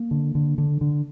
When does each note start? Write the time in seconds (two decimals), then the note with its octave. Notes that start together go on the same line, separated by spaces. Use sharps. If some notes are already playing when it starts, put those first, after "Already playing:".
Already playing: A#3
0.11 D3
0.35 D3
0.58 D3
0.81 D3